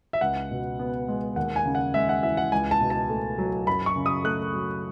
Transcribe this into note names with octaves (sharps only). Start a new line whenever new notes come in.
E5
C#2 F#5
B2
B3
G#3
D#2 F#5
G#5
C#3
F#5
G#3 E5
F#5
E3 E5
F#5
C#2 G#5
A5
B2
A5
A3
F#3
F#2 B5
C#6
C#3
D#6
A3 F#6
F#3